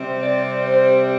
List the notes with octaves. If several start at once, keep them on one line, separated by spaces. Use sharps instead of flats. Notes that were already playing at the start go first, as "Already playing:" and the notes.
Already playing: C3 G3 C4
D5
C5